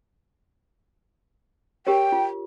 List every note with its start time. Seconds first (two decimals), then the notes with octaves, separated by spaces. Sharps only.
1.87 G4 A#4 C#5 G5
2.12 F4